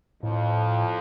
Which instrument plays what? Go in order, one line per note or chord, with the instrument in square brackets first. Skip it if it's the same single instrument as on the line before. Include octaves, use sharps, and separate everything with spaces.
[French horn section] F2 [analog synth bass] A2